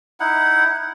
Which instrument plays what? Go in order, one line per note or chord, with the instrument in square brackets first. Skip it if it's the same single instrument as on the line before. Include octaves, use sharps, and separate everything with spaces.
[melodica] D#4 E4 F#5